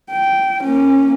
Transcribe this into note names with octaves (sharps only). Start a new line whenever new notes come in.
G5
A#3 C#4